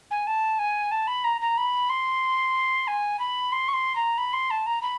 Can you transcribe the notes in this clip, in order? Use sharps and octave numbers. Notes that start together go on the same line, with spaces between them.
G#5
A5
G#5
A5
B5
A#5
A#5
B5
C6
G#5
B5
C6
C#6
C6
A#5
B5
C6
A5
A#5
B5